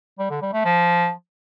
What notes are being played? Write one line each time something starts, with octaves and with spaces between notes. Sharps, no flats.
G3
D3
G3
A3
F3